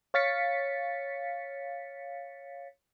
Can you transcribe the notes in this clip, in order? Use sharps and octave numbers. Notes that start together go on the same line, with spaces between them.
C#5 F5 A6 B6 C#7